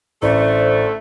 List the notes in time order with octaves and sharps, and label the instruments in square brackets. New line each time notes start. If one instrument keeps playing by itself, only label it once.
[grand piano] A1 [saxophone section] D3 A3 [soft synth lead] C5 [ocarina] D5